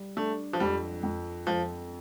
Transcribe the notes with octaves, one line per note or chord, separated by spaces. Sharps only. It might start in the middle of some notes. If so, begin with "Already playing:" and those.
Already playing: G3
A3 D4
F3
F2 G3
F2
F2 F3